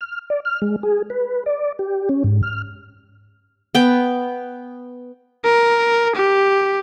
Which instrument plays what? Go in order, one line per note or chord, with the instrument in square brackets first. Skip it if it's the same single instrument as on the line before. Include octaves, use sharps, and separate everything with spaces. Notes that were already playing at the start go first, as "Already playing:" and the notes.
[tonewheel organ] F6
D5
F6
G#3
G#4
B4
D5
G4
C#4
G#2
F6
[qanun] B3 G5
[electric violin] A#4
G4